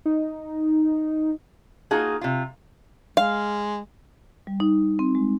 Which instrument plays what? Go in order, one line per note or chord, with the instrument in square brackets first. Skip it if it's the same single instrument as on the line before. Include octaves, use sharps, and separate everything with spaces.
[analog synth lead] D#4
[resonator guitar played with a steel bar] A#3 D#4 F4 F#4 G#4
C3 F4
[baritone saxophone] G#3 [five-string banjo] F5
[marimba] G3
D#4
C4
G#3